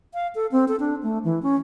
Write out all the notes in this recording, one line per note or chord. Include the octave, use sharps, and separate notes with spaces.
F5
A4
C4
A4
D4
A3
E3
C#4